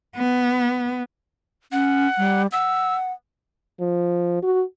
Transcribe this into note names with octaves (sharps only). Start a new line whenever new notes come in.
B3
C#4 F#5
G3
F#5 E6
F3
F#4